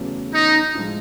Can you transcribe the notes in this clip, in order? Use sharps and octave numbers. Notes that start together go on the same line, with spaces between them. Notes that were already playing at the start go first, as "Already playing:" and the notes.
Already playing: E2 C#3 F#3 A3 C#4
D#4
A2 F3 G#3